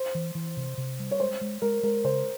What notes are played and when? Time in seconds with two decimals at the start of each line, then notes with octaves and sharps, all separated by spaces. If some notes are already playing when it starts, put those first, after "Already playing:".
Already playing: C5
0.15 E3
0.35 E3
0.57 C3
0.78 C3
0.99 G3
1.11 C#5
1.20 G#3 C5
1.41 G#3
1.62 G#3 A#4
1.83 G#3 A#4
2.04 C#3 C5